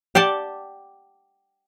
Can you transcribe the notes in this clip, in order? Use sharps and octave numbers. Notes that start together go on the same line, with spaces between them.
G4 D5 F#5 A5